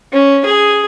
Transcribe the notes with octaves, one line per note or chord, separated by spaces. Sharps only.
C#4
G#4